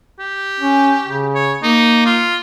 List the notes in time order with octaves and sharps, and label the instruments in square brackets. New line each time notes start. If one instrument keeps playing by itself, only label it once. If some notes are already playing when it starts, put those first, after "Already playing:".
[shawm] G4
[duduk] C#4
C#3
[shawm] C#5
[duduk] A#3 [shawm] D#4
[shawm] F4